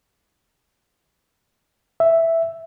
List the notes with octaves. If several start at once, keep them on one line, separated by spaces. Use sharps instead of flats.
E5